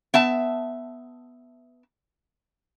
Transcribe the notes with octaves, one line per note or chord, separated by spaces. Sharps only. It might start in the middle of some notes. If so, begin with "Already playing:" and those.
B3 E5 A5